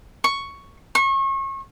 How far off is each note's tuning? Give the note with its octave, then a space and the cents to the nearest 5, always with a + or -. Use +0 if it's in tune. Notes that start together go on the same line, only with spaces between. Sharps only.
C#6 +5
C#6 -35